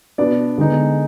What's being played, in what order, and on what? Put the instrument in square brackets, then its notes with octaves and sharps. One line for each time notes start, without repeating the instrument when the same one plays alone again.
[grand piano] B2 B3 D4 D5
D3 G#3 B3 D#4